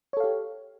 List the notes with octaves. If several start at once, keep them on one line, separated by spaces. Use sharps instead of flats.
G4 A4 C#5 F5